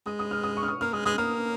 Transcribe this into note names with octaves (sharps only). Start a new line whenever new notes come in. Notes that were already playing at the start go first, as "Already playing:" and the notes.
G#3 D#6
D#6
F6
D#6
C#6
F6
D#6
A#3 F6
G#3 D#6
G#3 D#6
A#3 F6